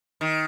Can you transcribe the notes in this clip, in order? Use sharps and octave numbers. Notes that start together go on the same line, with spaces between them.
D#3